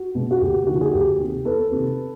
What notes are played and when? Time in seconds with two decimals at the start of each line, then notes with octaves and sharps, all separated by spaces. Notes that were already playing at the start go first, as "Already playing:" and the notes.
Already playing: F#4
0.15 B2 G#3 C#4
0.31 F#4
0.41 D2 G4
0.67 D3 F3 A#3 D#4 F#4
0.81 G#4
0.93 D2 G4
1.20 C3 D#3
1.45 E2 A4 B4
1.72 C3 D#3